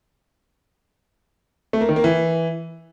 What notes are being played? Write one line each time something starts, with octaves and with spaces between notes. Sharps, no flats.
A3
A#3
D#3
A#3
E3